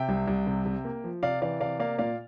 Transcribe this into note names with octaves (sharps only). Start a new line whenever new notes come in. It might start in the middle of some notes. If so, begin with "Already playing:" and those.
Already playing: C3 E5 G5
C2
C2
C3
C3
A#3
F3
C3 D5 F5
E3 D5 F5
C3 D5 F5
A#3 D5 F5
A#2 D5 F5